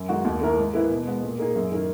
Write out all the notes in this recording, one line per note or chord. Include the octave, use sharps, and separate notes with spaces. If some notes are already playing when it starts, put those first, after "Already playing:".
Already playing: F#2
D#3 G#3 D#4 F#4
D#2
D#3 A#3 E4 A#4
G#2
E3 A#3 E4 B4
B2
G#3 B3
A#2
A#3 D#4 G#4
F#2
D#3 A#3 D#4